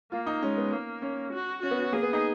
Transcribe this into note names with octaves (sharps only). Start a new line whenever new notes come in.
A#3 F4
D#4
G#3 C#4
B3
A#3
C#4
F#4
C#4 F#4
B3
C#4
A#3 G#4
B3
D#4